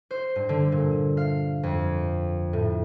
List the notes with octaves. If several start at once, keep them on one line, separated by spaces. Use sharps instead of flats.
C5
G2
D3
A#2
F5
F2
A2